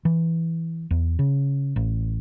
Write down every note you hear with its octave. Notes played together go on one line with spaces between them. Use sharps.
E3
E2
C#3
A1